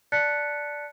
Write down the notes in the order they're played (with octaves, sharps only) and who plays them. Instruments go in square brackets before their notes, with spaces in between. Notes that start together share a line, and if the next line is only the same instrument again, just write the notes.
[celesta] D5 A5 F#6 A6 B6 C#7